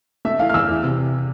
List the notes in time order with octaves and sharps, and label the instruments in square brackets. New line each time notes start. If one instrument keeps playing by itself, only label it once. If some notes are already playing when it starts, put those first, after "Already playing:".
[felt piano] A3 [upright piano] E5
[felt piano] E3 [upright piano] F5
[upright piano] F6
[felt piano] E2 [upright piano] E6
[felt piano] E3
C3